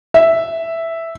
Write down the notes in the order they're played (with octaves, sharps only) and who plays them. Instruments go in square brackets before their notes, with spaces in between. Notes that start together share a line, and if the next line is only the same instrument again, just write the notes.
[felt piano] E5